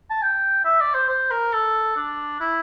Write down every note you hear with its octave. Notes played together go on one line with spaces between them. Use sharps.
A5
G5
E5
D5
C5
C5
A#4
A4
D4
E4